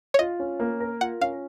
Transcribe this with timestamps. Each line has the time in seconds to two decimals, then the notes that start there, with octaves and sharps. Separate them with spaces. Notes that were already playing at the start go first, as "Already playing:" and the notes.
0.14 C#5
0.19 F4 D#5
0.40 C#4
0.60 A#3
0.80 A#4
1.01 F4 F#5
1.21 C#4 F5